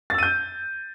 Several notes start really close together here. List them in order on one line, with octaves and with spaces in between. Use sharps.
A6 E6 D#7 G6